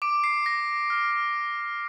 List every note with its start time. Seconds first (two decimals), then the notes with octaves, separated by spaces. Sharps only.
0.02 D6 D7
0.24 C7
0.46 A#6
0.90 F6